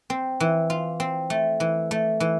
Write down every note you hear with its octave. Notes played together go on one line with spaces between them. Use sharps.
C4
E3
F4
C4
A3
E3
A3
E3